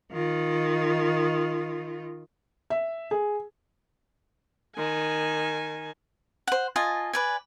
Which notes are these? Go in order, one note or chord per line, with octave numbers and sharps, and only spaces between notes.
D#3 F4
E5
G#4
D#3 G#5
C5 F#5
F4 D#5 G#5 A5
B4 D5 G#5